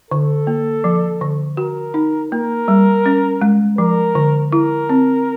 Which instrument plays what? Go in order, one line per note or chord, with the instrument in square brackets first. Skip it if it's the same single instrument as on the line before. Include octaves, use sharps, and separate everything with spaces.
[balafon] D3 [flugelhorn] A4
[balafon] A#3
F3
D3
[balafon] F#4 [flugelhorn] A#4
[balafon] D#4
[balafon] A#3 [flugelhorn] A#4
[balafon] G3
C#4
G#3
[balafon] F3 [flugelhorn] A#4
[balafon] D3
[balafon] E4 [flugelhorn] A#4
[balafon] C4